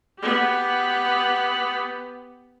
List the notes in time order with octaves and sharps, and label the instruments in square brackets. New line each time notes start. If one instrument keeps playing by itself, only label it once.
[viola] B3 G4